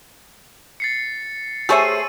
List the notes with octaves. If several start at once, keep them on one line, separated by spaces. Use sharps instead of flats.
A6 C7 C#7
A3 G4 G#4 C5 C#5 E5 E6 D#7